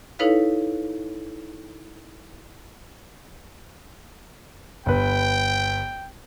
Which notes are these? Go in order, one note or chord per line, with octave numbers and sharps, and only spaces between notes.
D#4 E4 A4 B4 C#5 F5
G1 B4 G5